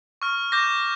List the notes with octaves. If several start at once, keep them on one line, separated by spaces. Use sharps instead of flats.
C#6 F6
D6 G6 A#6